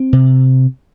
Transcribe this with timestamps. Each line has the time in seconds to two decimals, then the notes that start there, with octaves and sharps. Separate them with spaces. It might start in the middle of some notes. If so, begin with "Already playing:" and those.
Already playing: C4
0.13 C3